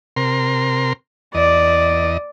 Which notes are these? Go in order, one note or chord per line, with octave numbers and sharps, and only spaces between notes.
C3 A#4 C6
E2 D5 D#5